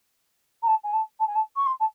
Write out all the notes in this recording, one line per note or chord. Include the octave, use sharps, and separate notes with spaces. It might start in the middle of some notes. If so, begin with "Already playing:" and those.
A#5
A5
G#5
A5
A5
G#5
A5
C#6
C6
A5